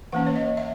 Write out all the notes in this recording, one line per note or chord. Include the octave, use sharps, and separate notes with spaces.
E3 A#3 C#4 F#5
C#5
D#5
E5